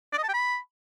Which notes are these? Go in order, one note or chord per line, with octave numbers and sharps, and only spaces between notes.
D5
D#5
A5
G5
B5